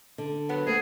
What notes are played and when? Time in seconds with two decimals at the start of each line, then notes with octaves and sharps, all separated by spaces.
0.18 D3
0.49 F#3 B3
0.67 A3 A#3 C4 G#4